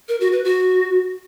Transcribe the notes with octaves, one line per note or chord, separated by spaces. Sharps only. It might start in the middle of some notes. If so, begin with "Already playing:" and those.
A#4
F#4
B4
F#4